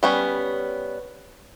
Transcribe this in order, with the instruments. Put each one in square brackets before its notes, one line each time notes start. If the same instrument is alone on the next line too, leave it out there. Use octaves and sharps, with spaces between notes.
[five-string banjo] G3 B3 C#4